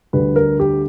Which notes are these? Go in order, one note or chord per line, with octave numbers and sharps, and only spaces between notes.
D2 D3 G3 B4
A#4
G4